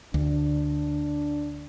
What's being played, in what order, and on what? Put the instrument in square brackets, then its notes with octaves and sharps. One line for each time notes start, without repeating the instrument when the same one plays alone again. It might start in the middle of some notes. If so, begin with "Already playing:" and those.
[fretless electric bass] D2 [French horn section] D4